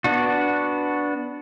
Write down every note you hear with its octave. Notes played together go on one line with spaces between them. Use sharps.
B3 D4 F#4